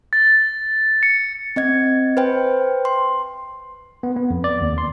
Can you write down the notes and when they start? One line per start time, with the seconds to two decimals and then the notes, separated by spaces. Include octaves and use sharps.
0.13 A6
1.03 C#7
1.56 C4 D#5 G#6
2.17 B4 C5 G5
2.85 C6
4.03 B3
4.16 B3
4.30 F2
4.44 D5
4.61 D#2
4.78 C6